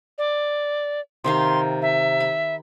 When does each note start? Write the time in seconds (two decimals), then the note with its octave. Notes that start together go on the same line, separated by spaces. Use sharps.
0.18 D5
1.24 C3 D#3 F5 C6
1.82 E5
2.20 B5